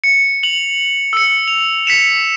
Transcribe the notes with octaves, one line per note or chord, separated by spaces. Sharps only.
C#7
F7 F#7
E6 C#7
F7
B6 C#7 E7 F7